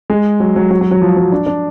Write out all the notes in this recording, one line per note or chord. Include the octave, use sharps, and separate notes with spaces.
G#3
F#3
F#3
F#3
F#3
F#3
F3
F#3
D4
D4